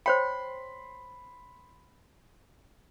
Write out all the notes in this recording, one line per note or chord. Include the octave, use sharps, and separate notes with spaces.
C5 C#5 G5 B5 C6